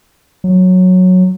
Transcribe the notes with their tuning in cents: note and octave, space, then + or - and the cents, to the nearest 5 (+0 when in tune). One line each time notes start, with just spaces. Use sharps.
F#3 -10